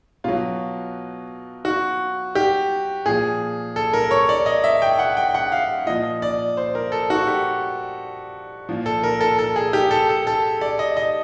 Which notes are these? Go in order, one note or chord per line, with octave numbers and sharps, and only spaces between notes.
B2 F#3 F4
F#4
G4
A#2 F3 G#4
A4
A#4
C#5
D5
D#5
E5
G5
F#5
G5
F#5
F5
A#2 F3 D#5
D5
C5
A#4
A4
F#4
G4
A#2 F3
A4
A#4
A4
A4
G#4
G4
A4
A4
A4
D5
D#5
D#5